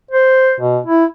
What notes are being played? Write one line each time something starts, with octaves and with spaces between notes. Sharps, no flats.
C5
B2
E4